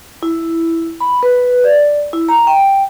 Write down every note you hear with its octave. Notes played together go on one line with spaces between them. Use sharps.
E4
B5
B4
D5
E4
A#5
G5